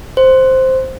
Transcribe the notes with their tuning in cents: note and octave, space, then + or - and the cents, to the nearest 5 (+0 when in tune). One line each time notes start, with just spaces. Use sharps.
C5 +0